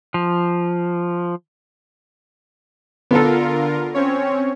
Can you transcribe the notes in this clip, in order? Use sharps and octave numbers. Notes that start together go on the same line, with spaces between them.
F3
D3 B3 F4 A4 A#4
C4 C#4 C#5